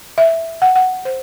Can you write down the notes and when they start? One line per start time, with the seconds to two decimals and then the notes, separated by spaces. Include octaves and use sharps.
0.18 E5
0.62 F#5
0.75 F#5
1.05 C5